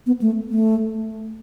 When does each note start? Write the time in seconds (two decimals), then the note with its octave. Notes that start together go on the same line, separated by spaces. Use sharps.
0.06 B3
0.22 A3
0.50 A3